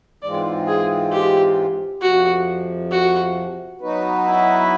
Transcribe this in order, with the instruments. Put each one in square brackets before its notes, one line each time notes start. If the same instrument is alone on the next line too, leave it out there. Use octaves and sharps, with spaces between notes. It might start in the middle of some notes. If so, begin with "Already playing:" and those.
[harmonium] G#2 E3 G#3 C4 F4 [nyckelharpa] D5
[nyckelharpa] G#4
G4
[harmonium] F2 C3 F3 [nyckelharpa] F#4
[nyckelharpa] F#4
[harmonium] F#3 B3 D#4 F#4 B4
[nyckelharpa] E4